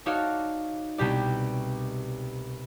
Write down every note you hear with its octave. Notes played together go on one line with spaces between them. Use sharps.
D#4 F#4 A4 C#5 D5 F5
C2 B2 G4 D5